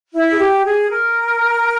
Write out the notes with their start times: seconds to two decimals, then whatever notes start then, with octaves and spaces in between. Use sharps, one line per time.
0.13 E4
0.31 G#4
0.39 G4
0.64 G#4
0.90 A#4